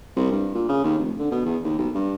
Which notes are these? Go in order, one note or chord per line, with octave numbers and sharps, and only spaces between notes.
C2
G2
A#2
C#3
D#2
F1
D3
B2
E2
D#2
B1
G2